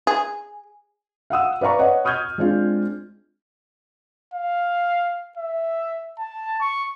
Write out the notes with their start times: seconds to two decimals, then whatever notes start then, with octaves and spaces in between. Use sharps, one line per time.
0.07 G#4
1.30 F5 F#5 D#6 E6
1.61 B4 D5 F5 A#5 C#6
1.79 C#5 D#5 F#5
2.05 C#6 D#6 F6 G6 G#6
2.38 G#3 C4 D4 F4
4.34 F5
5.37 E5
6.19 A5
6.60 C#6